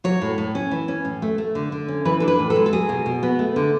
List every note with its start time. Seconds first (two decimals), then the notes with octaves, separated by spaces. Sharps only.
0.04 F#3 C#5
0.22 A2
0.38 A2
0.55 C#4
0.71 E3
0.88 C#4
1.05 A2
1.22 A3
1.38 A3
1.55 D3
1.72 D3
1.88 C#4
2.05 E3 B4
2.20 D4 A4
2.28 B4
2.39 A2
2.50 A4
2.56 G#3
2.66 A4
2.73 F#3 G#4
2.89 B2
3.06 B2
3.23 B3
3.39 A3
3.56 D3